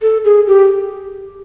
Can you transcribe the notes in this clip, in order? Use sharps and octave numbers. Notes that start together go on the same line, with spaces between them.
A4
G#4
G4